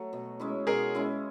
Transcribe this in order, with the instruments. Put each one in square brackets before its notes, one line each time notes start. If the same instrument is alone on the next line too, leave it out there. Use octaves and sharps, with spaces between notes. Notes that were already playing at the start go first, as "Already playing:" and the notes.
Already playing: [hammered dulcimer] F#3 A3
B2
G#3 C#4 E4
[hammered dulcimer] B2 [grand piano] G#4 A#4
[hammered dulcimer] G#3 C#4 E4